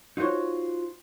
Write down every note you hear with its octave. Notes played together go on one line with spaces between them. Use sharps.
D#4 F4 F#4 C5 C#5